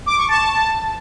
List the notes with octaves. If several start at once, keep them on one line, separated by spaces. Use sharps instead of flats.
D6
C#6
A5